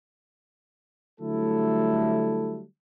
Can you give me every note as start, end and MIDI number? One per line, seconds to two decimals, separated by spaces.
1.21 2.63 50
1.21 2.63 54
1.21 2.63 55
1.21 2.63 57
1.21 2.63 64
1.21 2.63 69